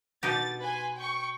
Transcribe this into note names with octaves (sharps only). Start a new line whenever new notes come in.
B2 D#4 G4 A6
B4 G#5 C6
G5 C#6